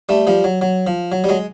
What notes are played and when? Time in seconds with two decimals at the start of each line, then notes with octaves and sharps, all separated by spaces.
0.09 G3 A3
0.27 F3 G3
0.44 F#3
0.61 F#3
0.87 F3
1.12 F#3
1.24 G3
1.29 F#3 G#3